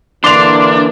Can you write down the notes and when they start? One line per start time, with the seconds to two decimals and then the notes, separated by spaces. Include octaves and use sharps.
0.24 D3 E3 A#3 D4 C6 D6 F7